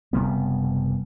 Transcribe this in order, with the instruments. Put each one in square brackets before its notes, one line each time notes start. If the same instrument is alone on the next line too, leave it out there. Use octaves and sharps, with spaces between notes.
[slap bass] F#1 C3 G3 B3